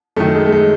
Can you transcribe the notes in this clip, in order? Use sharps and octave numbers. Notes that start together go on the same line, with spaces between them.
F#2 D#3 A3
G#3
A3
G#3